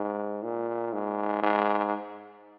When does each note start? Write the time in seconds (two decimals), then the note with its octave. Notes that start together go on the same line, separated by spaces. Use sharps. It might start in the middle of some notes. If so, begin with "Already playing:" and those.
Already playing: G#2
0.43 A#2
0.93 G#2
1.42 G#2